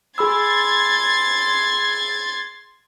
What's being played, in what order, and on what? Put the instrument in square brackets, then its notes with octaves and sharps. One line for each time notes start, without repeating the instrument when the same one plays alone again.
[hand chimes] G#4 B5 E6 [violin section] C6 G#6 A6